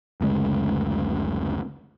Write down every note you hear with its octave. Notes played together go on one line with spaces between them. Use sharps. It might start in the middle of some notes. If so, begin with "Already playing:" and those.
F#1 D2 C#3 G#3